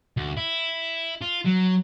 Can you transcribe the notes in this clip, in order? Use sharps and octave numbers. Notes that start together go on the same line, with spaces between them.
D2
E4
F4
F#3